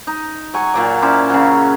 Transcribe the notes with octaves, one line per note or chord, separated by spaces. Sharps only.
D#4
F#3 G#5 C#6
A#2 F#3 D5
C#4 E4 C5 D5
C#3 F#3